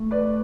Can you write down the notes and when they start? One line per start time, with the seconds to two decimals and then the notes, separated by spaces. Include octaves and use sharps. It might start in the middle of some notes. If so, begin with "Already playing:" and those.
Already playing: A3
0.11 B4 D5